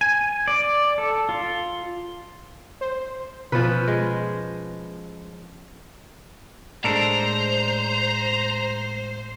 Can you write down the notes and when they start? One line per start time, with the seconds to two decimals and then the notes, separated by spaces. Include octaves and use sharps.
0.01 G#5
0.48 D5
0.98 A4
1.29 F4
2.81 C5
3.52 B2 F3 C#4 B4
3.88 G#3
6.84 A2 G#3 D4 A4 A#4 C5 A#5